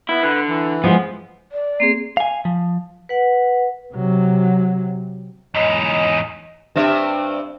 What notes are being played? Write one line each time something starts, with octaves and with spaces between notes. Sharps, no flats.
B3 E4
D3 B4
E3
F3 G#3 B3
D5
A#3 C4 G#4 C7
F5 G#5
F3
B4 F#5
C3 F#3
E2 G#2 C#5 D#5
G2 C4 E5